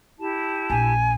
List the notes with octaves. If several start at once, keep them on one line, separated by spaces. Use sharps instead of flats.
E4 G4 A5
A#1 G#5